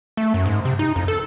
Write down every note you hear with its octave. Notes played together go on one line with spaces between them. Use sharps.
A3
F#2
G#2
C3
D#4
F2
A4